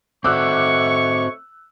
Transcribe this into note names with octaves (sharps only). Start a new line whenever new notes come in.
A3 C4 F#4 C#5 C#6 D6 E6 F#6